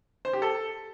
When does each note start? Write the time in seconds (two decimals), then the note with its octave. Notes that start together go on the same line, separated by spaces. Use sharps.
0.25 C5
0.33 G4
0.42 A4